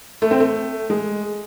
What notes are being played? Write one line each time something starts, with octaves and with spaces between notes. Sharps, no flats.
A3
C4
A3
G#3